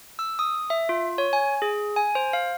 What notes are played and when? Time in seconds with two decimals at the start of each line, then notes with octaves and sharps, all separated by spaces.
0.19 E6
0.39 D#6
0.70 E5
0.89 F4
1.18 C#5
1.33 G#5
1.62 G#4
1.96 G#5
2.15 C5
2.33 F5